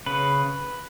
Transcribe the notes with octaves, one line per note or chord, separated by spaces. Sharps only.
C#3 B4